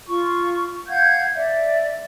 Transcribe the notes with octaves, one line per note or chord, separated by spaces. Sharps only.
F4 C#6
F5 F#5 G6 G#6
D5 E5